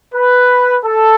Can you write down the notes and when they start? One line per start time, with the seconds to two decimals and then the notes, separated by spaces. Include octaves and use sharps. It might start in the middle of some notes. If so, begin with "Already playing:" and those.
0.14 B4
0.83 A4